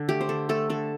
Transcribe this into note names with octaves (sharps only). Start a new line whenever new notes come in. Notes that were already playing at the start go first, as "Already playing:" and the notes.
Already playing: D3 A4
A3 G4
C5
D3 A4
A3 A4
D3 A4